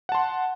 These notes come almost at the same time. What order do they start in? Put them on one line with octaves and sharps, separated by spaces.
F#5 A5 C6